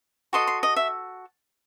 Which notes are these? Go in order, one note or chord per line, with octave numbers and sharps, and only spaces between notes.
F#4 A4 D#5 C6
C6
D#5
E5